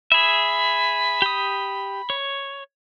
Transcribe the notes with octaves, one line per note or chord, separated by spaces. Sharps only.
G#4 E5 B5
G4 D#6
C#5